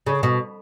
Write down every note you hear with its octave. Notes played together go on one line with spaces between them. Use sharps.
C#3
B2